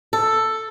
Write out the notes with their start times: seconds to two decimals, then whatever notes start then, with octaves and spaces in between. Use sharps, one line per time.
0.13 A4